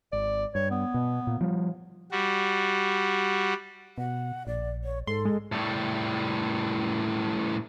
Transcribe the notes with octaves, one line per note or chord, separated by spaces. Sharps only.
G#1 D5
G2 C#5
B3
B2
A#2
F3 G3
G3 F#4
B2 F#5
A#1 D5
C#5
G#2 A4 C6
G#3
A2 G3